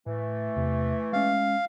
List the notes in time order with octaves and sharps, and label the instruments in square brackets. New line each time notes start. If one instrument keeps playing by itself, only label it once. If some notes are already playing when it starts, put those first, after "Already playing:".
[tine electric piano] A2 [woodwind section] E3 A3
[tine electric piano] E2 C3
[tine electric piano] G#3 C#4 [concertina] F5